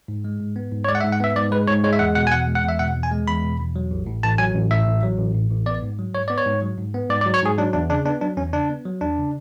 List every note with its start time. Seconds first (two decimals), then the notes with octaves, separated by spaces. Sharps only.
0.08 G#2
0.24 G#3
0.40 G#2
0.56 B3
0.72 G#2
0.84 C#5
0.88 G#3 D5
0.95 F#5
1.01 E5
1.04 G#2
1.12 F#5
1.20 B3 E5
1.36 G#2 D5
1.52 G#3 B4
1.67 G#2 C#5
1.84 G#3 C#5
1.93 E5
1.99 E2 F#5
2.15 B2 F#5
2.27 G#5
2.31 E2 F#5
2.47 G#3
2.55 F#5
2.64 E2 E5
2.79 B2 F#5
2.96 E2
3.03 G#5
3.11 G#3
3.28 E2 B5
3.43 B2
3.60 E2
3.76 F#3
3.91 A1
4.06 A2
4.23 A1 A5
4.38 F#3 G#5
4.54 A1
4.71 A2 E5
4.87 A1
5.03 F#3
5.18 A1
5.34 A2
5.50 A1
5.66 B3 D5
5.82 G#2
5.99 F#3
6.14 G#2 C#5
6.28 B3 D5
6.38 C#5
6.46 G#2
6.62 F#3
6.78 G#2
6.94 B3
7.10 G#2 D5
7.21 D5
7.26 F#3
7.34 C#5
7.42 G#2 G#4
7.58 F#3 D4
7.73 E2 D4
7.90 C#3 D4
8.05 B3 D4
8.21 F#3 D4
8.37 E2 C#4
8.53 C#3 D4
8.69 B3
8.85 F#3
9.01 E2 D4
9.18 C#3